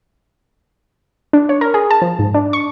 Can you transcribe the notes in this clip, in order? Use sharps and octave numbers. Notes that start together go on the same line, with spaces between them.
D4
C#5
A#4
G#4
A5
F3
G#2
D4
C#6